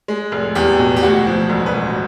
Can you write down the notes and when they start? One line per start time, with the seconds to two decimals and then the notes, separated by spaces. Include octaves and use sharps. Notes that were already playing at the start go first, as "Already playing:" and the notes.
0.08 G#3
0.32 F1
0.55 E2 G4
0.79 B2
0.96 G4
1.03 D2 F#4
1.27 F3
1.50 E1
1.66 B4
1.73 E1